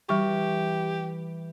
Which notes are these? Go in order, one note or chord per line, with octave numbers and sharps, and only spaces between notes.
E3 G3 G4 C#6